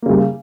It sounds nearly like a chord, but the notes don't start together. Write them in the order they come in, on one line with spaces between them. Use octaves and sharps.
A#3 C#3 G3